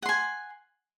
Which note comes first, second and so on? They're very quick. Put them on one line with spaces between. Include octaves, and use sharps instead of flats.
F#5 C6 G#5